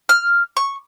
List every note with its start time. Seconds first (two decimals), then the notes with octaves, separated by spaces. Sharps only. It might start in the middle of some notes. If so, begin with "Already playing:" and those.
0.09 F6
0.57 C#6